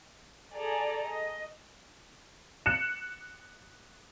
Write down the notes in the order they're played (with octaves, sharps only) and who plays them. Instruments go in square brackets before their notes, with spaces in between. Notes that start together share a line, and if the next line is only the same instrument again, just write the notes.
[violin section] G#4 A4 D5 A#5
D#5
[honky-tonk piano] F#6 C#7 E7